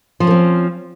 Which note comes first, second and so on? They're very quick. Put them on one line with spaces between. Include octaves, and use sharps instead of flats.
F3 C#4 A3 C4